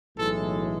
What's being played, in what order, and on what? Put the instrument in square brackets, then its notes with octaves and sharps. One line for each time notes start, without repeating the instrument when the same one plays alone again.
[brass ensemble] B1 A2 E3 G#3 A4